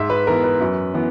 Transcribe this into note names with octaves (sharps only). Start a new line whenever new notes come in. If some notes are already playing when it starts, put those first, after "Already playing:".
Already playing: G#2 E5
B4
E3 B3 A#4
B4
F#2
E3 B3